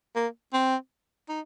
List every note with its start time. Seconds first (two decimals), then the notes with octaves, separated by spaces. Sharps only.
0.15 A#3
0.53 C4
1.29 D#4